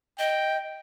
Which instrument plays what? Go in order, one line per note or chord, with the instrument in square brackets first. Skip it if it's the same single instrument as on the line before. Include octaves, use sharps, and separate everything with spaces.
[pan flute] D#5 [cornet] G5